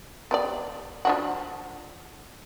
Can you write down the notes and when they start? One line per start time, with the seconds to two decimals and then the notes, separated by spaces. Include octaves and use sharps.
0.31 B3 G4 D5
1.05 F3 D4 F#4